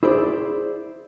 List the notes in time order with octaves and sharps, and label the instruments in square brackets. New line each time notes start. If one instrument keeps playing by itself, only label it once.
[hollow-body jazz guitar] E4 G#4 C5 D5